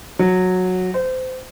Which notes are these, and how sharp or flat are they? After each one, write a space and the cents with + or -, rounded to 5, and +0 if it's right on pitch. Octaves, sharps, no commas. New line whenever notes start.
F#3 -10
C5 -25